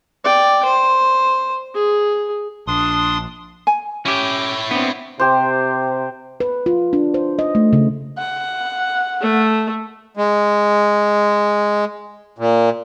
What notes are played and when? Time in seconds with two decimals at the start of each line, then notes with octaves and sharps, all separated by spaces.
0.24 D5 G5
0.65 C5
1.74 G#4
2.67 A#1 D4 C6 D#6
3.67 G#5
4.05 C#4 E4 G4 C#5
4.71 B3 C4 D4
5.20 C3 G4 C5
6.40 B4
6.66 F4
6.93 D4
7.14 C5
7.39 D#5
7.55 A3
7.73 C#3
8.18 F#5
9.21 A3
10.17 G#3
12.38 A#2